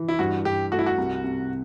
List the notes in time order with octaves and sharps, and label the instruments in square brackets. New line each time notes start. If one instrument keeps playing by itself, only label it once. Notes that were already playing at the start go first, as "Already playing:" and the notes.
Already playing: [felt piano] E3
[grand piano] E4
[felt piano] G2 [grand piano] F#4
[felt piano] G2 [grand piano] G4
[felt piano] A3 [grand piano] F#4
[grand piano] E4
F#4
[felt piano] C2
C3